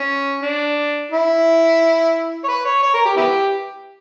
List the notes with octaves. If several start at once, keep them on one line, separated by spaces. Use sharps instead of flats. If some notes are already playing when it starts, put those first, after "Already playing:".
Already playing: C#4
D4
E4
C#5
B4
C#5
C#5
A#4
G4
B3 E4 G4